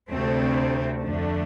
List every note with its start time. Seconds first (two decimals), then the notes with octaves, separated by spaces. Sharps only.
0.12 D2 C3 A3 C4
1.05 F2 D3 A3 D4